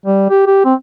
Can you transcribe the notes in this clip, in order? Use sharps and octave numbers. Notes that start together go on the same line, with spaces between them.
G3
G4
G4
C4